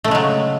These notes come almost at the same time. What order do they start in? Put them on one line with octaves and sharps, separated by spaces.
A3 C#3 G#3 F#3